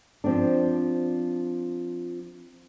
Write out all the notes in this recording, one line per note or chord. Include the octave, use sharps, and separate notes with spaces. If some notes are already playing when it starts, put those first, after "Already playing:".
F3 C4 D4